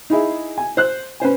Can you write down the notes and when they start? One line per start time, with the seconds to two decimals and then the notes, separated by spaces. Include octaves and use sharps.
0.10 D#4 E4 G#4 E5
0.58 G#5
0.77 C5 F#6
1.20 C#4 B4 C5 G#5